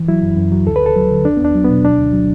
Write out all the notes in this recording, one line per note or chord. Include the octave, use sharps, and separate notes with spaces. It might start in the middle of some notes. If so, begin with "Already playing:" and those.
Already playing: E3
F#3 E4
F#2
F#2
F#3
D2 A4
B4
D2
A4
F#3
D3
E2 D4
B3
E2 D4
F#3
B2 B3
D2 D4
D2
F#3